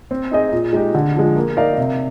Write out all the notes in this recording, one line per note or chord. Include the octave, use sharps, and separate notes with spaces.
C4
D#4 G#4 D#5
A#2
G#3 D#4 G4
D3
F3 G#3
A#3
D#4 A#4 D5 F5
C3